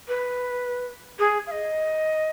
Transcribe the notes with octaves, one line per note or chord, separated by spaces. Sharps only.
B4
G#4
F5
D#5